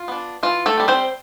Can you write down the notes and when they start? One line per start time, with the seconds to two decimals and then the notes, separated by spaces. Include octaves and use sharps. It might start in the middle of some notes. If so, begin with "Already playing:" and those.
Already playing: F4
0.08 B3 D4
0.43 E3 F4
0.66 A3 A4
0.77 G3 C4
0.88 C4 C5